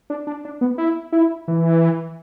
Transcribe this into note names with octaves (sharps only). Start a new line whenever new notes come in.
D4
D4
D4
B3
E4
E4
E3